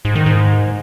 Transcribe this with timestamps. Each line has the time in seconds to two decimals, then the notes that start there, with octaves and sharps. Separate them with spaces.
0.05 G#2
0.15 D#3
0.26 G#2